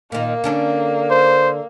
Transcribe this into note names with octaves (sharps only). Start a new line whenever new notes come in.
A#2 D#3 A#3
D3 C#4 D4
C5